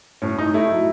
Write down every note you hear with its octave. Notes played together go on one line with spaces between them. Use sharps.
A2 C#4
A2 D#4
A3 E4
F#3